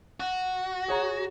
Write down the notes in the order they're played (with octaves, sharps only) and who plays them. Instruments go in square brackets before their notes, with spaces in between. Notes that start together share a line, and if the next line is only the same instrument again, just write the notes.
[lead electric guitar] F#4
[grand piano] G#4 C#5 A#5